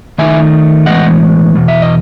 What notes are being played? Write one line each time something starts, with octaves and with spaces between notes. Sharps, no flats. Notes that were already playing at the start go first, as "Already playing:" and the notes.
D#3 A3 D#4 E5 G#5
A2 E3 G#3 B3 D#5 F#5
E2 B2
E5
D#5